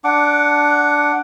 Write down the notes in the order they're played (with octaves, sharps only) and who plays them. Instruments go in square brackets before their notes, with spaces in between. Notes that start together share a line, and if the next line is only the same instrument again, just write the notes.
[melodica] D4 F#5 D6